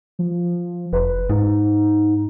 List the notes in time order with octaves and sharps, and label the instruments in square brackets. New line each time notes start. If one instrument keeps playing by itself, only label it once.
[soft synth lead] F3
[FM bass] F1 [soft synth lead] B4
[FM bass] G#2 [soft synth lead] D#4